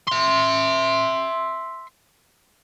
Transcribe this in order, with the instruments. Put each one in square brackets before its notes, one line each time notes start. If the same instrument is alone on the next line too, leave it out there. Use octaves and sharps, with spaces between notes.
[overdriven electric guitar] E5 C6